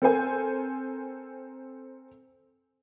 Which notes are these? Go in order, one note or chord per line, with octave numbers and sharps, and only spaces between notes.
C4 A4 A#4 C5 G#5